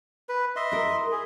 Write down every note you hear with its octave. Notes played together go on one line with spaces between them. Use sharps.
B4
D#5 E5 C6
E4 A#4
G#4